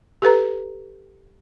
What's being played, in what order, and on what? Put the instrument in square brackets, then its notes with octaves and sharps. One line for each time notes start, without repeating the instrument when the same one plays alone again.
[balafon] G4 A4 B4 A#5